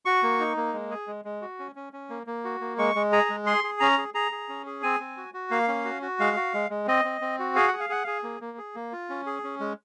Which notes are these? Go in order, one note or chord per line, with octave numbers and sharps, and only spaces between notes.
F#4 C#6
A#3
D#4
A#3
G#3
G#4
G#3
G#3
F#4
C#4
C#4
C#4
A#3
A#3
F#4
A#3
G#3 C#6
G#3
G#4 A#5
G#3
G#4 C6
G#4
C#4 A#5
G#4
G#4 A#5
G#4
C#4
G#4
C4 G#5
C4
F#4
F#4
A#3 F5
C#4
F#4
F#4
G#3 F5
F#4
G#3
G#3
C4 D#5
C4
C4
F#4
G#4 F5
F#5
G#4
F5
G#4 F#5
G#4 F5
A#3
A#3
G#4
A#3
F4
C#4
G#4
C#4
G#3